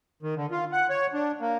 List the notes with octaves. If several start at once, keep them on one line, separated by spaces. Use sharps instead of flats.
D#3
D3
F4
F#5
C#5
D4
A#3